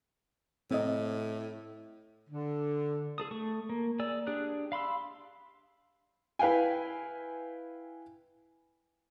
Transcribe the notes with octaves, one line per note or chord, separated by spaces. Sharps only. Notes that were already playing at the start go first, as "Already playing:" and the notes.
A2 C4 D#5
D3
G#4 A4 D#6
A3 C#6
A#3
G#4 D5 E6
D4 G4 G#4 D#6 F#6
F5 B5 C6 E6
E4 B4 F5 G5 G#5